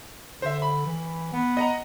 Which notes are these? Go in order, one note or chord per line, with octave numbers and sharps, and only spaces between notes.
D3 C5 E5
B5
E3
B3
D#5 F#5 A#5